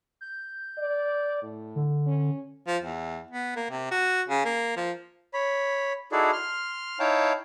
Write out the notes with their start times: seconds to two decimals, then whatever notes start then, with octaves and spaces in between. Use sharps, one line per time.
0.21 G6
0.78 D5
1.42 A2
1.75 D3
2.07 C#4
2.67 F3
2.82 E2
3.31 B3
3.56 A#3
3.70 C3
3.91 F#4
4.28 C#3
4.45 A#3
4.76 F3
5.34 C#5 B5
6.12 D#4 E4 F#4 G#4 A4 D5
6.33 C6 F6
7.00 D#4 E4 C#5 F5 G5 A5